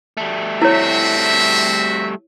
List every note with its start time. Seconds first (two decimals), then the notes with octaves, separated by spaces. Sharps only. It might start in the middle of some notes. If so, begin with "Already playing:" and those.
0.17 G3 A3
0.62 C4 E4 F#4 C#5 E5